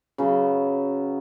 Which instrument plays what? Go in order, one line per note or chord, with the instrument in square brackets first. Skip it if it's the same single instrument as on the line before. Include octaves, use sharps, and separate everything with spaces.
[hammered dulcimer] C#3 F#3 B3